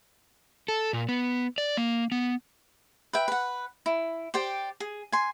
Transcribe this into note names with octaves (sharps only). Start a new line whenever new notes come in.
A4
A#2
B3
D5
A#3
B3
B4 E5 G5
B4 F#5
E4
G4 C5 D5 G5
G#4
G#5 C6